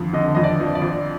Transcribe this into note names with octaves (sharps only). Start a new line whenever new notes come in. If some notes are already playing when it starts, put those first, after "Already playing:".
Already playing: F2 D3 F3
D3 D#5
F2 D#5
D5
F3
D5
F2